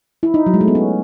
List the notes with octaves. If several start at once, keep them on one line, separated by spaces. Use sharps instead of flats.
E4
D#4
F#3
G#3
A3
B3
C#4